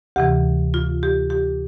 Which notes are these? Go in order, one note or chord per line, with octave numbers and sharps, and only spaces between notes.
D2 C3 E3 G4
F4
G4
G4